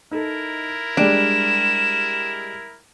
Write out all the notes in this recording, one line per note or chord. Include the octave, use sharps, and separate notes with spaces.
D#4 E4 A4 A#4
G3 G#3 D4 E7